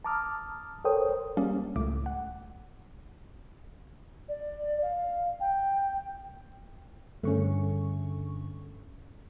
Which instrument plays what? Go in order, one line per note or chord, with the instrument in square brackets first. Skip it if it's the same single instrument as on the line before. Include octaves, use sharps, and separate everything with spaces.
[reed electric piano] A5 A#5 D6 D#6 F6
A4 A#4 C5 C#5 G5 D#6
[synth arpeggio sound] G3 A#3 C#4
C#2 A2 A3 D6
F#5
[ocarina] D5
F5
G5
[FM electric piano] G2 D3 C#6 [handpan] A3 C#4